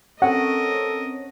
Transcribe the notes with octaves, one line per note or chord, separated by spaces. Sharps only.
C4 C#4 A4 A#4 C#5 D#5 F#5